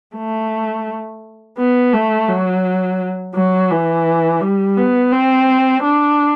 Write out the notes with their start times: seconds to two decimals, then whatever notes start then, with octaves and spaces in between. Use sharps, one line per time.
0.16 A3
1.58 B3
1.93 A3
2.28 F#3
3.34 F#3
3.71 E3
4.41 G3
4.77 B3
5.12 C4
5.83 D4